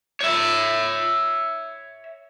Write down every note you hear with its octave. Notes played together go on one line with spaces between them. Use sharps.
C#5 E5